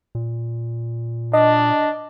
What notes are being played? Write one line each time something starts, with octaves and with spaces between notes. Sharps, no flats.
A#2
D4 D#5